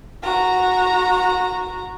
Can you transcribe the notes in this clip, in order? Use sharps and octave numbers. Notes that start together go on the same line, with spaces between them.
F#4 A#5